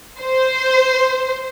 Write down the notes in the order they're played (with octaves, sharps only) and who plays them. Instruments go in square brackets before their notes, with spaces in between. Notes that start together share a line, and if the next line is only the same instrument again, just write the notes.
[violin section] C5